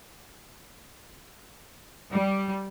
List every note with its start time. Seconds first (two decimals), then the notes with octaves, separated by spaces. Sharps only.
2.11 G3